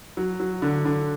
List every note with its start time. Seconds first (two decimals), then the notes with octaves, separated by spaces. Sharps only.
0.17 F#3
0.40 F#3
0.62 D3
0.85 D3